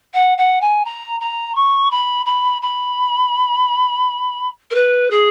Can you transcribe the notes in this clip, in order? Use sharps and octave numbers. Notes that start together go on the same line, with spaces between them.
F#5
F#5
G#5
A#5
A#5
C#6
B5
B5
B5
A#4
B4
G#4